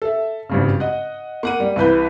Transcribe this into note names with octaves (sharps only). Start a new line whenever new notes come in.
A4 E5
G#1 G2 C#3
D#5 F#5
A#3 F#5 D#7
G3
C2 E3 B4 G6